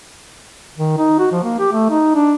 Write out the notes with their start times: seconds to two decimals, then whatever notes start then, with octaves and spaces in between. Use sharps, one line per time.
0.78 D#3
0.98 D#4
1.19 F#4
1.32 F3
1.43 A#3
1.59 G4
1.73 A3
1.90 D#4
2.15 D4